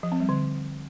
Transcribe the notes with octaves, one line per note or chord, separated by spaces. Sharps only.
F3
C4
G3
D3